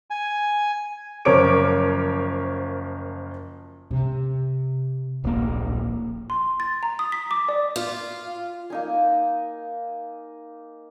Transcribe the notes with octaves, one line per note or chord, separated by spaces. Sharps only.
G#5
F#1 F3 A#4 C#5 D6 D7
C3
D1 A#1 A#3
C6
A6
A#5
D#6
B6
D6
D5
F4
A#3 D#4 G#5